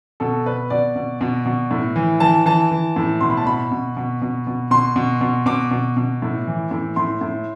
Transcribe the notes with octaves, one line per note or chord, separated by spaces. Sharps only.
B2 A4
B2 B4
B2 D5
B2
B2
B2
A2
E3
E3 A5
E3 A5
E3
A2
B2 C6
B5
A5
B2 B5
B2
B2
B2
B2
B2 C6
B2
B2
B2 D6
B2
B2
A2
E3
A2
A2 C6
A2